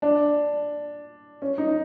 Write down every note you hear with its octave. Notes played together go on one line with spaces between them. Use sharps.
D4
C#4
D#4